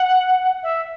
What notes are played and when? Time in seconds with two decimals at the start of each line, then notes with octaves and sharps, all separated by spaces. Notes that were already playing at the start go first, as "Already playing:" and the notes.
Already playing: F#5
0.63 E5